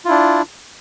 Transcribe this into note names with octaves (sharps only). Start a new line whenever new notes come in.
D4 E4 F4